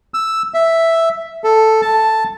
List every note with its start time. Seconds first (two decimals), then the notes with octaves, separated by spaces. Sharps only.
0.14 E6
0.54 E5
1.44 A4
1.82 A5